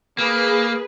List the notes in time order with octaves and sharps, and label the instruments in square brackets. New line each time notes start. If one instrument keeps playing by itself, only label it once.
[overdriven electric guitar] A#3 [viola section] G#4 B4